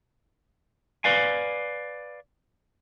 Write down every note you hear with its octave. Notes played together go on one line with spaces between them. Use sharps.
B4 D5 F5 G#5